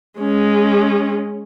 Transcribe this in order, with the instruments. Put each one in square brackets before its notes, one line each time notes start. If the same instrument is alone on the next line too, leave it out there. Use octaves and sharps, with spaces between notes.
[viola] G#3 C#4